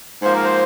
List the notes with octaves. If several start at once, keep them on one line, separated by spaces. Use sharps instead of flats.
G#2 F3 A#3 C5
A#4
C5